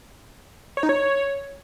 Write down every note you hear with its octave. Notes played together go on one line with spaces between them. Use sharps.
C#5
D#4
C#5